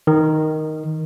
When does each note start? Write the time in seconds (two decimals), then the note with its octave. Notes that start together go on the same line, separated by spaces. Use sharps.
0.07 D#3